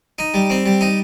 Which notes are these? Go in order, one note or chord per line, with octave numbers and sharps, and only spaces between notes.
D#4
G3
C4
G3
D#4